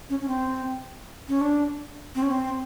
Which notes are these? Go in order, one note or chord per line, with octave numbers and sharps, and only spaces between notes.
C#4
C#4
C4
C#4
D4
C4
C#4
C4